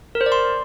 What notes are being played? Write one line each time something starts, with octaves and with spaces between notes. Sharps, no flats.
A#4
C5
D5
C6